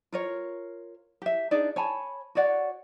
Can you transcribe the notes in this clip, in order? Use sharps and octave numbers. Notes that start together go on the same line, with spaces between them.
F4 A#4 C#5
G4 E5
D4 D#4 G#4 D5
C#5 G#5 A5 B5
F#4 C#5 D5 F#5